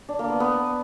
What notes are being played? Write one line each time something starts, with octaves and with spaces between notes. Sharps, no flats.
D4
A#3
B3
B3